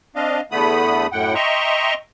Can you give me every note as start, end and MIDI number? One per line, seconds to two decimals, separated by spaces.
0.16 0.41 60
0.16 0.41 62
0.16 0.41 75
0.16 0.41 77
0.51 1.07 40
0.51 1.07 50
0.51 1.07 57
0.51 1.07 59
0.51 1.07 83
0.51 1.07 87
1.12 1.34 42
1.12 1.34 45
1.12 1.34 78
1.12 1.34 79
1.35 1.94 75
1.35 1.94 76
1.35 1.94 79
1.35 1.94 82
1.35 1.94 84
1.35 1.94 85